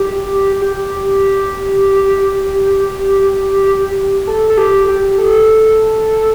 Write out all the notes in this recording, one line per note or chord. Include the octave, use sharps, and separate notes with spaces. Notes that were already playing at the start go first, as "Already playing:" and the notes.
Already playing: G4
G4
A4
A4
G4
G4
A4